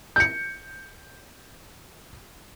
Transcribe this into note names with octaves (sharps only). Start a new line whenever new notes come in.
G6 C#7